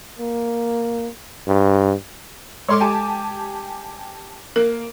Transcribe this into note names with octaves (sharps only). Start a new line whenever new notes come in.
A#3
G2
G#3 A4 C#5 C6 D6
G4 G#5 A5
A#3 A#4